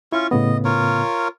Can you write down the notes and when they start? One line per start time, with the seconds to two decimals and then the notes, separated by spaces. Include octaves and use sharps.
0.12 C#4 E4 F4 C#6
0.31 A2 C#3 B3 D#5
0.65 F4 A#4 C#5